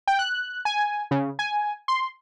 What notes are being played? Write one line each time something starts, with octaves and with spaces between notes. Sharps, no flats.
G5
F#6
G#5
C#3
G#5
C6